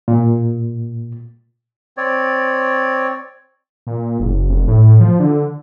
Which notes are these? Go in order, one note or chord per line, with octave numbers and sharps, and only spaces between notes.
A#2
C4 C#5 D5
A#2
F#1
F1
A2
F3
D3